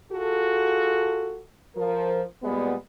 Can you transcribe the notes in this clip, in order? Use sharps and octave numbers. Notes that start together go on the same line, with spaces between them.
F4 F#4 G#4 A4
F3 A#4
A#2 G3 G#3 B3